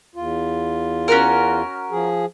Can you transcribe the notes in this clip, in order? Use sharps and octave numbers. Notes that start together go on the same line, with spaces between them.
E2 F4
C#4 F#4 A#4
F3 G#4